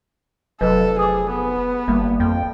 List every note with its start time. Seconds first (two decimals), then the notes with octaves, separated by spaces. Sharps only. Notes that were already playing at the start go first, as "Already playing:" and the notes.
0.61 F1 F#3 A4 B4 D#5
0.99 G#4 D6 D#6
1.31 B3
1.88 G1 G3 A#3
2.20 F2 G5